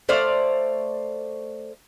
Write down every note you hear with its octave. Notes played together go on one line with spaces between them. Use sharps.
A3 C5 D5 F5